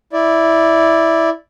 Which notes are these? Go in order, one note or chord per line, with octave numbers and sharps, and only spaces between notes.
E4 D5